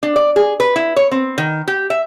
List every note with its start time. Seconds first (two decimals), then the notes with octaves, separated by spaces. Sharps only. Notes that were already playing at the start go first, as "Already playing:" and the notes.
0.03 D4
0.16 D5
0.36 G#4
0.60 B4
0.76 E4
0.96 C#5
1.11 C4
1.38 D#3
1.68 G4
1.90 E5